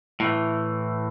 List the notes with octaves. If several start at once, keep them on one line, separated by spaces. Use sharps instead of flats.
A2 E3